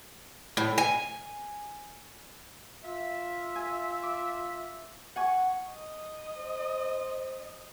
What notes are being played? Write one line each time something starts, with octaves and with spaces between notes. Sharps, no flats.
A2
G#5
F4 E5
G#5
D6
F#5 G#5 C#6
D#5
C5